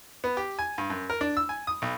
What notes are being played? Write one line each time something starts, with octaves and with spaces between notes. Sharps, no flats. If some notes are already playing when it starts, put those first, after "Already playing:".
B3
G4
G#5
G2
F#2
A#4
D4
E6
G#5
D#6
B1